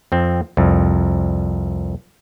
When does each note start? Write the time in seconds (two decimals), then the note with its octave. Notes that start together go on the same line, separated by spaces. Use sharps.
0.12 F2 C4
0.57 C2 F2